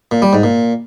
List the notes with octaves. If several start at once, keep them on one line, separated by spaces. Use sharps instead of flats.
A#2
G3
G#2
A#2